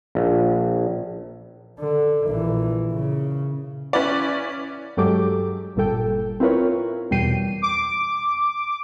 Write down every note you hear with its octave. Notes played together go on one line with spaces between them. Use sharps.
A#1
D3
A#1 E3
C#3
C#4 E4 B4 D5
G2 F#3 G#3 G4 A4 D6
G1 A#2 G3 A4 G5
C4 E4 F4 A#4 B4 C#5
E2 B2 G3 G5 C7 D#7
D6